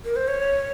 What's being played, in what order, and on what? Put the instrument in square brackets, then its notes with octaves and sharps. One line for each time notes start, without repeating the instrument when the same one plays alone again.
[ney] A#4
C5
C#5